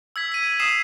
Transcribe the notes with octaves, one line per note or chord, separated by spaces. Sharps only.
E6 G#6 B6
B6 D#7
D#6 E6 C7 D#7 E7